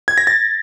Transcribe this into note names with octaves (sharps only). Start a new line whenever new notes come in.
G#6
A#6
A6